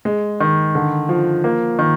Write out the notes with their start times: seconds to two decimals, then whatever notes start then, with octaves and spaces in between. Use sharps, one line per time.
0.05 G#3
0.41 D#3
0.75 D3
1.09 F3
1.44 A#3
1.79 D#3